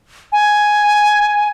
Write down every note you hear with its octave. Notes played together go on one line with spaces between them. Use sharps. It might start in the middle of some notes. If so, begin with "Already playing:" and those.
G#5